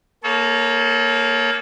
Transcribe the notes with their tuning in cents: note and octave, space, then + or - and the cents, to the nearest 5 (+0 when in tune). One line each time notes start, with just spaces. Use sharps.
A#3 +0 A4 -35 C#5 +0